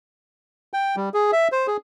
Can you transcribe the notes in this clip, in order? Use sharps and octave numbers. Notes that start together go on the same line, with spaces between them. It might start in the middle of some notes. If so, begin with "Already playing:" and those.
G5
G3
G#4
E5
C5
G#4